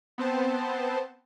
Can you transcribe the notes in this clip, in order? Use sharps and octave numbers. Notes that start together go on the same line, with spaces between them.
B3 C4 C5 A5